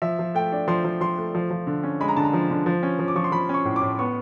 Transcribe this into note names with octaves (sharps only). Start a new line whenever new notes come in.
F3 E5
F3
A3 G5
D4
F3 C6
F3
F3 C6
A3
F3
F3
D3
C#4
G#3 B5
A#5
D3 A5
A#5
F3
D3
F3
C#4
F3
D6
F3 C#6
C6
F3 B5
C#4 C#6
A2
D6
A2
B3 C#6